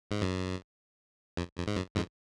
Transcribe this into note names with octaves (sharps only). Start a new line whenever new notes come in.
G#2
F#2
F2
F2
G#2
F#2
F2 G#2